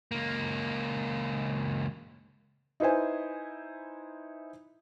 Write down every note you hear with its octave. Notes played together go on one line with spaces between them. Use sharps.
C#2 A#3
D#4 E4 B4 C5 G#5